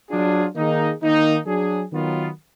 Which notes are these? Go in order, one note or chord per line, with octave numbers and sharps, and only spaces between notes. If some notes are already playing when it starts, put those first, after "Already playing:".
F#3 D4 F4 G#4
D#3 A#3 D#4 G#4
D#3 A#3 D#4
F#3 D4 G#4
D#3 F#3 B3 F4